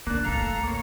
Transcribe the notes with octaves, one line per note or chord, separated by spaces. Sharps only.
D3 A#3 D4 F#6
A1 D2 A4 F5 A#5
A#3 C#5